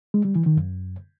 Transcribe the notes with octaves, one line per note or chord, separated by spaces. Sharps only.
G#3
G3
E3
D#3
F#2